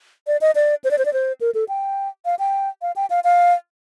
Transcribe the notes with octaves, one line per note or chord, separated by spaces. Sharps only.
D5
D#5
D5
C5
D5
C5
D5
C5
A#4
A4
G5
F5
G5
F5
G5
F5
F5